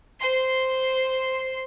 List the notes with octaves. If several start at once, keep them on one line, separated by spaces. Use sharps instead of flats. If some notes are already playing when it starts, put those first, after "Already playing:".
C5 C6